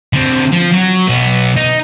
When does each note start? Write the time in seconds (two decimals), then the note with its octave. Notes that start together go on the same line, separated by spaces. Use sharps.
0.13 D3 C4
0.52 F3
0.72 F#3
1.07 B1 B3
1.56 D#4